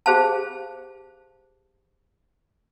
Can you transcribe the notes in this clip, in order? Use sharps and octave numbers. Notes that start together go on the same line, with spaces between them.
G4 G#4 C5 F5 A5